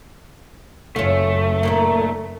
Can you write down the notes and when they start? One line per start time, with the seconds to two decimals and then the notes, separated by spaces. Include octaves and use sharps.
0.96 F#1 A3 C#4 F4
1.63 A#2 D#3 A#3